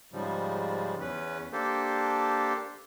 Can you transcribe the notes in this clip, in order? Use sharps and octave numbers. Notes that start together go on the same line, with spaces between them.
G#2 C#3 F3 G3
E2 C#4 B4
A#3 D4 G4 A4 C5